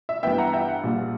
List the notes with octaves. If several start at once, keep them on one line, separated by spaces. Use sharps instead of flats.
E5
G2 E3 B3 E5 G5
F#5 A#5
E5 G5
F#5
A#1 A#2 G3